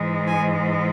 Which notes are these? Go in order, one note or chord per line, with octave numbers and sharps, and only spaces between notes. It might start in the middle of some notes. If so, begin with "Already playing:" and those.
Already playing: G#2 E3 G#3
G#5